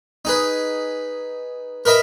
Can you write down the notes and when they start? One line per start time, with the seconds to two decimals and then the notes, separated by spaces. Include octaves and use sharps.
0.25 D#4 G#4 B4
1.85 A#4 B4 D#5 E5 A#5